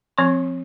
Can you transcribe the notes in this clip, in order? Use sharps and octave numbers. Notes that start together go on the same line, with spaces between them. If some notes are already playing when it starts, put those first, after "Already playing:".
F3 C4 C#6